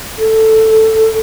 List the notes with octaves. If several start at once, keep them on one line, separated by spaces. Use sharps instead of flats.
A4